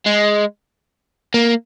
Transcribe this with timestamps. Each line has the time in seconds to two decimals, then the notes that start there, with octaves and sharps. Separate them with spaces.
0.06 G#3
1.34 A#3